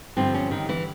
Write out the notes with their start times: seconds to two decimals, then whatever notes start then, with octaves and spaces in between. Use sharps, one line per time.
0.16 G2 D3 F3 C4
0.34 C#4
0.51 D#3 D#4
0.69 E3 E4